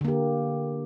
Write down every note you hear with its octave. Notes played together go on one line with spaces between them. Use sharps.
D3 A#3 G4